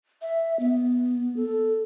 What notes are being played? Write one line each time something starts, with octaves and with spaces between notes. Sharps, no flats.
E5
B3
A4